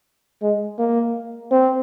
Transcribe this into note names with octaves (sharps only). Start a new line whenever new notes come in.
G#3
A#3
C4